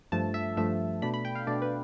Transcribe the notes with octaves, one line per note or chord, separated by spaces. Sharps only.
G2 F3 A3 A5
E5
G2 F3 A3 E5
B2 A3 D4 B5
B5
G5
F5
B2 A3 D4 D5
B4